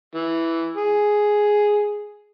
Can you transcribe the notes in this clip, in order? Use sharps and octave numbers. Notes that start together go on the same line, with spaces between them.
E3
G#4